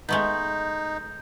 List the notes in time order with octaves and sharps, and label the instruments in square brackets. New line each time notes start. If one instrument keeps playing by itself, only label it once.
[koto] G#3 A3 B3 [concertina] D#4 [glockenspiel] G6